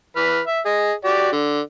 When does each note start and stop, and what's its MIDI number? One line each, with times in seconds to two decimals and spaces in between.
0.16 0.40 52
0.16 0.40 71
0.16 0.40 89
0.47 0.60 76
0.66 0.92 68
0.66 0.92 75
1.04 1.30 66
1.04 1.30 67
1.04 1.30 74
1.32 1.60 50